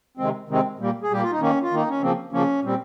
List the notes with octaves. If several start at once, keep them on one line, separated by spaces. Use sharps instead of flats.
C3 D#3 G#3 C4
C3 D#3 G#3 C4
A#2 G3 A#3
G#4
A#2 G3 A#3 G4
F4
D#4
D#3 A#3 C#4
F4
D#3 A#3 D#4
C#4
C#3 F3 A#3 C4
C#3 F3 A#3 C#4
A#2 G3 C4